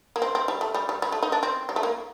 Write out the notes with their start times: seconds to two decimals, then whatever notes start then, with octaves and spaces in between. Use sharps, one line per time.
0.16 A#3
0.22 C4
0.35 C4
0.48 G3
0.61 A3
0.74 G3
0.89 G3
1.02 G3
1.12 A3
1.23 D#4
1.32 D4
1.43 C4
1.69 G3
1.76 A3
1.83 A#3